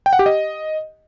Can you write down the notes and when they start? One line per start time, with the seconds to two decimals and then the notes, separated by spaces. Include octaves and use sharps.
0.06 G5
0.13 F#5
0.19 G4
0.26 D#5